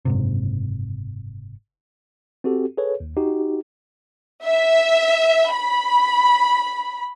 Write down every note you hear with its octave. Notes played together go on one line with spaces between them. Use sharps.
F#1 G#2 C3
C4 F#4 G4 A4
G#4 A4 B4 C#5
D#2
D#4 F#4 G4
E5
B5